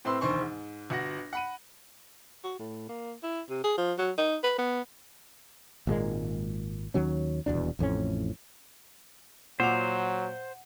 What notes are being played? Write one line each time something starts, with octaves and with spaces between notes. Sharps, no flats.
A2 C4 B4 C6 E6
E1 D2 D#3 C5 C6 C#6
G#2
G1 F#4 F#5 A#6
F#5 B5 D#7
F#4
A2
A#3
E4
C3
G#4
F3
F#3
D#4
B4
B3
G#1 A#2 G#3 A#3
D#2 D#3 F#3 C#4
D#1 E2 B2 D4
A1 F2 A2 C#4
A#2 F#3 C5 F#5 D6 F7